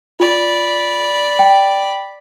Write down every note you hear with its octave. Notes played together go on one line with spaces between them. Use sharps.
F4 D5 B5
G5